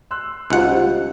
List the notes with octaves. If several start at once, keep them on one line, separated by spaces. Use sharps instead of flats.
C6 E6 F#6
C#2 D#4 F4 C5 F#5
G3 F4